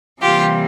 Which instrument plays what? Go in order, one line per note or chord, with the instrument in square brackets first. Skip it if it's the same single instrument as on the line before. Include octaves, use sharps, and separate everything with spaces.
[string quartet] C3 E3 G3 A#3 F4 G4